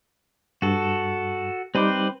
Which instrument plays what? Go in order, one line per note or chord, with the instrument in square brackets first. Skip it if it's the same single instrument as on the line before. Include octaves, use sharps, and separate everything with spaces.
[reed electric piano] G2 [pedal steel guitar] F#4 A4
[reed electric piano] G3 D#4 D6 [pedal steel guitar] C4 B4 C5